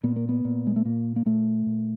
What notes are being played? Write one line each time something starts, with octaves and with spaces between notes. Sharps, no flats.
A#2 B3
A#3
B3
A#2
G#3
A3
A#2 A#3
A#3
A#2 A3
A#2